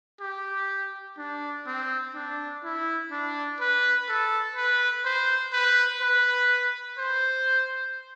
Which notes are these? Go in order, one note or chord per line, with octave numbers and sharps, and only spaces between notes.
G4
D4
C4
D4
E4
D4
B4
A4
B4
C5
B4
B4
C5